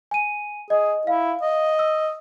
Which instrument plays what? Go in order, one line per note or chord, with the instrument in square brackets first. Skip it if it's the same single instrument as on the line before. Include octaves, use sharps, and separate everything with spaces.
[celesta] G#5 D#7
[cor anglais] G#4 [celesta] D#5
[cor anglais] E4 [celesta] F5
[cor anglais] D#5
[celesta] E6